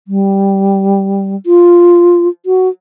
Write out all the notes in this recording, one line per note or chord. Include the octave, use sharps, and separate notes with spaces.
G3
F4
F#4